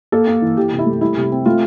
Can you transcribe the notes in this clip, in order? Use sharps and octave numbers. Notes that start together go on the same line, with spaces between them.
A#3 A4
A#3
E3
E3 G4
C3
E4
A3
G3 E4
C3
C4
A3 F4